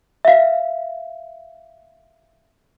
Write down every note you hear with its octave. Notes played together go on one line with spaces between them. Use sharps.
E5 F5